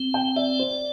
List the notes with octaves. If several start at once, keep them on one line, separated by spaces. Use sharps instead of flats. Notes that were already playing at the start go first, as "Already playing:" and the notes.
Already playing: C4
G5
D5 E5
C5